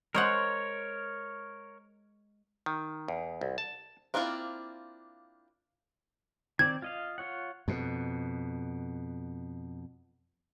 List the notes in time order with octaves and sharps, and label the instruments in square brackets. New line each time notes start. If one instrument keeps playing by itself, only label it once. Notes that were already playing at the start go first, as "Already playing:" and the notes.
[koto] G#3 C5 F#5 [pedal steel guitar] A#4 C#5
[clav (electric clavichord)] D#3
E2
C2
A5
[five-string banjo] A#3 C4 D4 E4 F4
[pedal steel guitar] D#3 C4 D5 [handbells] G#6
[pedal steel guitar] F4 D#5 F5
F4 C#5 F#5
[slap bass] F2 B2